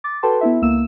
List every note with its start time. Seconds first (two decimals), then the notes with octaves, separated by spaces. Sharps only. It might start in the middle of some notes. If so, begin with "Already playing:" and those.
0.04 D6 A6
0.23 F#4 A4 B4 G5 A5 C6
0.41 B3 E4 E5
0.62 C#2 A#3 E6 E7